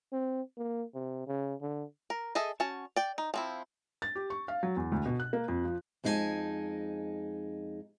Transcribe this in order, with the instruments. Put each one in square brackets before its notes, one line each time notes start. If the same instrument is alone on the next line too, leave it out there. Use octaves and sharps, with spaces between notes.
[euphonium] C4
A#3
C3
C#3
D3
[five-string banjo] A#4
G#4 A4 D#5 E5
C#4 F#4 A5
D5 G5
D#4
F3 C4 E4
[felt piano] A6
G4
C#6
F5
F#3
E2
D2
B2
F#6
A#3
F2
F3
[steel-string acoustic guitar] F2 G#3 D#4 F#4 G#5 A5